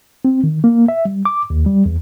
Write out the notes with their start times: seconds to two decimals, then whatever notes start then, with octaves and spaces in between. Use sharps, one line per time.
0.25 C4
0.44 D#3
0.64 A#3
0.88 E5
1.05 G3
1.25 D6
1.50 D#2
1.66 G3
1.86 E2